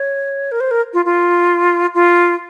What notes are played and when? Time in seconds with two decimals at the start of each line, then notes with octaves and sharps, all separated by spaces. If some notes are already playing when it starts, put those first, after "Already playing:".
Already playing: C#5
0.52 A#4
0.60 C5
0.71 A#4
0.94 F4
1.05 F4
1.94 F4